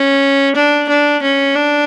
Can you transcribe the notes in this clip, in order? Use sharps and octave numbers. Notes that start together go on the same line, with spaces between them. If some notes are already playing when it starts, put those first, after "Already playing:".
Already playing: C#4
D4
D4
C#4
D4